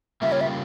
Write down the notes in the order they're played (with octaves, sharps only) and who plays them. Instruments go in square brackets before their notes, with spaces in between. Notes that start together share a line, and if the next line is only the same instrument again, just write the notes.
[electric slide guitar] C#3 G3 A#3 F4 [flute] E5
[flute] C#5
E5